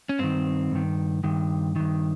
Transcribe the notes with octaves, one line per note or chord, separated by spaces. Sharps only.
C#4
G2 D#3 C4
G2 D#3
G2 D#3
G2 D#3